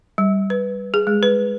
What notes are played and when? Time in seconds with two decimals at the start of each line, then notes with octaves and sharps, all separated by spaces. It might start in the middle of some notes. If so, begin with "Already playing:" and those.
0.18 G3
0.50 B4
0.94 G#4
1.07 G#3
1.23 B4